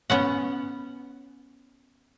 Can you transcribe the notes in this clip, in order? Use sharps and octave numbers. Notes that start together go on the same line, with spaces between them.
B3 C#4 F#5